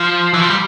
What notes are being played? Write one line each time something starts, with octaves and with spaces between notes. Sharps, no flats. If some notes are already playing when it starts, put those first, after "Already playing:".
Already playing: F3
E3
F3
G3